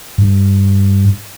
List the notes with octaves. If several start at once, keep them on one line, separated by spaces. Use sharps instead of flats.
G2